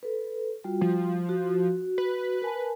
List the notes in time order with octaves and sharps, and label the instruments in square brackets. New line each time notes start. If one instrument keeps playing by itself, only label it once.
[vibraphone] A4 B4
G3 F4 F#4
[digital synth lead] F3
[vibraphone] F#4
[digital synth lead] B4
[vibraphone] A#4 G#5 A5